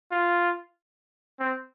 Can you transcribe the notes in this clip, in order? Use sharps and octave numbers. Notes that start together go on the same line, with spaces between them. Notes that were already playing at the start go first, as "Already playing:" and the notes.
F4
C4